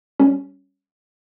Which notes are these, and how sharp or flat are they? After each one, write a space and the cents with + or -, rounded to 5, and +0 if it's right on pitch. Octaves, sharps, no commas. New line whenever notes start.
G3 -10 C#4 +0